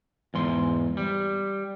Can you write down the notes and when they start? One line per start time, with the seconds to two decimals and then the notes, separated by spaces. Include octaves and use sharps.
0.34 E2 G#2 C6
0.97 G3